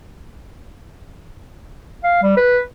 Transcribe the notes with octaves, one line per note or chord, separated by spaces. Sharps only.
F5
G3
B4